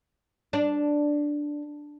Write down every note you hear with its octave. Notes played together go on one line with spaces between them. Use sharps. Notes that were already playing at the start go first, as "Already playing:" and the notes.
D4